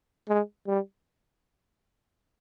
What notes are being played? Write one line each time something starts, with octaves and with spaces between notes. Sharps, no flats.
G#3
G3